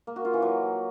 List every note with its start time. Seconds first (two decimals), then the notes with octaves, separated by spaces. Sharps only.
0.07 A#3
0.16 F#4
0.25 F4
0.34 E3
0.42 F#3